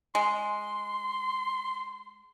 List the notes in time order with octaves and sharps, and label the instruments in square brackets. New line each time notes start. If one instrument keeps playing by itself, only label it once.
[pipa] G#3 [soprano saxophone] C6